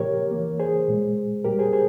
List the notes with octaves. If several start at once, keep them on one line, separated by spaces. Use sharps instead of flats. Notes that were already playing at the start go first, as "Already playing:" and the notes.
Already playing: A#2 F3 A#3 G4 A#4 C#5
E3 A#3
G#4 C5
A#2 G#3
A#2 G3 A#3 G4 A#4
G#4 C5
G#4 C5